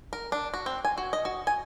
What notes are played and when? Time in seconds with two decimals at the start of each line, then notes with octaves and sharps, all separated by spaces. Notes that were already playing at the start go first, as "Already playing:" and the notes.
0.13 A#4
0.32 D4
0.54 F#4
0.66 C4
0.85 G#5
0.98 F#4
1.13 D#5
1.25 F#4
1.47 G#5